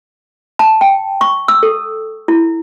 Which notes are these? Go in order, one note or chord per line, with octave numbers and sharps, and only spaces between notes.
A5
G5
C#6
E6
A4
E4